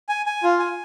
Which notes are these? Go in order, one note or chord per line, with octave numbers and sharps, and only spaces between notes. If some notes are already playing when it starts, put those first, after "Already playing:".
G#5
G#5
F4
G#5